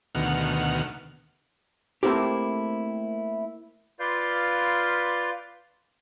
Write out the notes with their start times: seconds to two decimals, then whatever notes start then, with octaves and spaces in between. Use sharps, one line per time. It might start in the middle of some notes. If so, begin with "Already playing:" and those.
0.15 D2 B2 D#3 F#5 F6
2.03 A3 A#3 C4 E4 G4
4.00 F4 B4 D5 F5 C6 G6